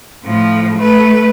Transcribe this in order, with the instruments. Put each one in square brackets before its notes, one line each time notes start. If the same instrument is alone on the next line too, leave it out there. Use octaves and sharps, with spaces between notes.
[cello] A2 F3
A3 B4